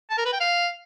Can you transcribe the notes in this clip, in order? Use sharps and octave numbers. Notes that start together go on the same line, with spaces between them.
A5
A#4
B4
G5
F5